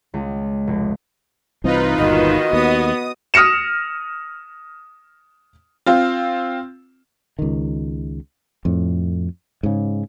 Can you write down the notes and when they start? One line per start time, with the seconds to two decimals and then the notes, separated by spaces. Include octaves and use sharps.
0.14 C#2
0.67 F1
1.64 C2 E3 C4 D#4 F4 B4
1.99 G1 D#2 A#2 D#3 F#4 D#5
2.53 D#2 B3 D#6
3.34 D#6 F6 A#6 C#7 E7
5.86 C4 F4
7.39 C#2 D#3
8.65 F2 A2
9.63 G#2 C#3